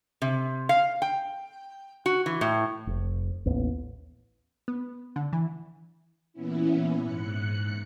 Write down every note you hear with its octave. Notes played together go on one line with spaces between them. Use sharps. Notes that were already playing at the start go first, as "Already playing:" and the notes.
C3
F5
G5
F#4
E3
A2
F1
A1 D#2 B3
B3
D3
E3
A#2 E3 B3 C#4 E4
G#2 F#6 C#7